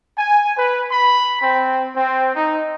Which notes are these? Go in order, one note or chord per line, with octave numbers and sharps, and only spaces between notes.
G#5
B4
B5
C4
C4
D#4